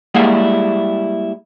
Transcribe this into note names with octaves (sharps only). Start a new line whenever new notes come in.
G3 G#3 A#3 E4 G#4 F#5